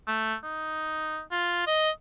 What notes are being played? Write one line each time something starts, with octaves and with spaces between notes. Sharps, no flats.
A3
D#4
F4
D#5